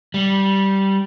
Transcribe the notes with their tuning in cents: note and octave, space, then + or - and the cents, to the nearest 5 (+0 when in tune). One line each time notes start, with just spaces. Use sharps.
G3 -10